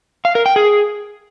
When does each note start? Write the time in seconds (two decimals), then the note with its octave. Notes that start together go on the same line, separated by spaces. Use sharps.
0.25 F5
0.35 A#4
0.46 G5
0.56 G#4